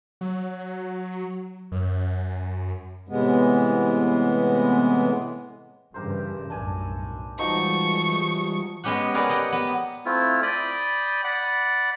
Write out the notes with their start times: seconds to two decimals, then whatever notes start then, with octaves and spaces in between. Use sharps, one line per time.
0.21 F#3
1.72 F#2
3.09 A2 C3 E3 G#3 B3
5.94 G2 C#3 E3 G4 A#4 C5
6.50 B1 F#2 A2 D4 G#5
7.39 E3 F3 G3 G#3 D#4 F#4 C#6
8.84 G#3 B3 C#4 G4 F#5
9.14 G#4 A#4 B4 C#5 D5 F#5
9.29 G4 D#5 F#5
9.53 B3
10.05 A3 C4 E4 F4
10.43 D5 G5 B5 D#6
11.24 D5 F#5 B5